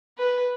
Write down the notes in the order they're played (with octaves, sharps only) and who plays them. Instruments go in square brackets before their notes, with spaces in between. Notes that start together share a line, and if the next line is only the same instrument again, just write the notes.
[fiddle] B4